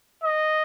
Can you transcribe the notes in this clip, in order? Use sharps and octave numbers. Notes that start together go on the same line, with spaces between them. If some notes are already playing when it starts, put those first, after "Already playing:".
D#5